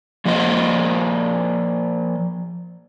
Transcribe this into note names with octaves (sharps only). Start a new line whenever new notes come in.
F3 A#3 C5 D#5